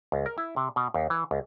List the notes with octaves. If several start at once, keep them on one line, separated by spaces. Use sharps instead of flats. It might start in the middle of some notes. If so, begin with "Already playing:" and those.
C#2
A#4
E4
C3
B2
D#2
E3
C#2